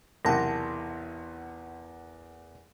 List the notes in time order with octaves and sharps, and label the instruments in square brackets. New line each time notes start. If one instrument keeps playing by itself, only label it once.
[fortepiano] B1 C3 [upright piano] E2 [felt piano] A#4 F#5 [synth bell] A5 A#6